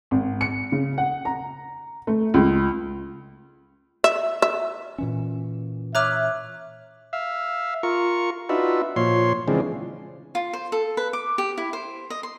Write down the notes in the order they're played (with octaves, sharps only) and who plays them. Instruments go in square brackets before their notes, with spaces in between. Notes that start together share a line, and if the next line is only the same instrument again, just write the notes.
[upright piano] G#1
C#7
C#3
F#5
A#5
A3
C#2
[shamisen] E5
E5
[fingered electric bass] A#2 E3 C#4
[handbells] C#5 F#6 [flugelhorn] E5 [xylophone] A#5 D6 F6
[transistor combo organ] E5 F5
F4 A#4 C#6
D4 D#4 F4 F#4 B4 E5
A#2 F3 C#5 C6
C#3 E3 F3 G#3 C4 D4
[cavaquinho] F4
C5
A4
B4
D6
G4
E4
C5
D#5
C6